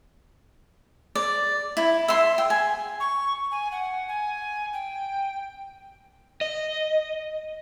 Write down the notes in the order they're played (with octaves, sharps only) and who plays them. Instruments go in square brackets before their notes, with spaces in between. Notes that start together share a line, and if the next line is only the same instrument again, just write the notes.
[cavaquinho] D5
E4
E5 C6
G5
G#5
[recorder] C#6
G#5
F#5
G#5
G5
[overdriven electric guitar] D#5